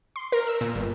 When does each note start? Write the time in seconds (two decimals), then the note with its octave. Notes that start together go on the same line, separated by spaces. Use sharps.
0.16 C6
0.32 A#4
0.47 E6
0.61 A#2
0.75 G1